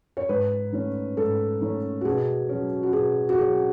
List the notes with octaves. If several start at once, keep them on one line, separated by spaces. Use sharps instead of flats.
C#5
G#2 B4
D#3 A3 C#4
G#2 A4
D#3 A3 C#4
F#4
B2 G#4
F#3 C#4
F#4
B2 G#4
F#4
F#3 C#4 G#4